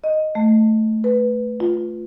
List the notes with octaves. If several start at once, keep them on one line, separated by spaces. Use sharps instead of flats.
D#5
A3
B4
F4